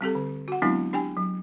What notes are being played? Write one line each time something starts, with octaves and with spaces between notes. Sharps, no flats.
G3 C4 G4 A4
D3
F#4 F#5
F#3 G#3 B3 C4 D4 E4
D4 G4 G5 G#5
F#3